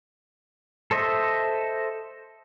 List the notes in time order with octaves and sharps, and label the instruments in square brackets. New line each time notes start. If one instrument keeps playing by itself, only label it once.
[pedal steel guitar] A4 C5 D#5 E5